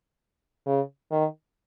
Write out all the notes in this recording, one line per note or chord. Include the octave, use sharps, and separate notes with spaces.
C#3
D#3